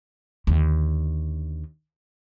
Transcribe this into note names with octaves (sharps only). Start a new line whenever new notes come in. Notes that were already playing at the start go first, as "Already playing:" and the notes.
D#2 D3